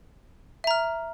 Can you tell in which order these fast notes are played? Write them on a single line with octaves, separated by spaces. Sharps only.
E5 A#5 F6